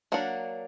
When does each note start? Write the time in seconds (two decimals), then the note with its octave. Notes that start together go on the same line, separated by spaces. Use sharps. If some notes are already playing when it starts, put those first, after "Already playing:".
0.12 F#3 A#3 D4 F#4